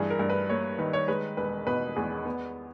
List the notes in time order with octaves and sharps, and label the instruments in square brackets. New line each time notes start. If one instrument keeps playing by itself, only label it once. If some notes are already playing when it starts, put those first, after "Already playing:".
Already playing: [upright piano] G2 E3 G#4
A#4
G2
B4
A#3 C#5
D#3 B4
C#5
G#3 B4
E1 B4
B2 B4
E2 G#4
B3